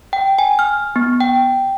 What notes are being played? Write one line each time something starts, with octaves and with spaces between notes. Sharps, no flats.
G5
G#5
F6
B3
G5